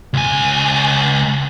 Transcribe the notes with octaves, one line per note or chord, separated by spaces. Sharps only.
C#2 G#5